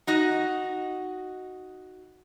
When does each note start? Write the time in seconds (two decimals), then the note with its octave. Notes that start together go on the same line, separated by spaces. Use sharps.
0.07 D#4 F#4 D#5